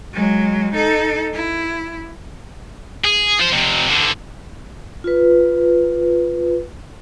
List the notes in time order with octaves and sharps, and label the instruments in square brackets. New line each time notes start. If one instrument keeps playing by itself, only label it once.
[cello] F#3 G#3
D#4 A4
E4
[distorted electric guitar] G#4
F4 C5
F2 C3
E2 D3
[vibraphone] F4 B4